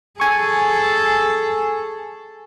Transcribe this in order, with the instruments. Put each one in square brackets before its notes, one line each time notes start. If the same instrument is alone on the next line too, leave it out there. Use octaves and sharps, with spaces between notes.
[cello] G#4 A4 [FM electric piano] G#5 C#6